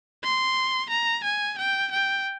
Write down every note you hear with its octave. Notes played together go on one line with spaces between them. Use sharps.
C6
A#5
G#5
G5
G5